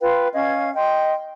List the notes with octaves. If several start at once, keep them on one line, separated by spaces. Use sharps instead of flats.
F4 B4 F5 G5
C#4 D#5 F5 G#6
D#5 G5 C6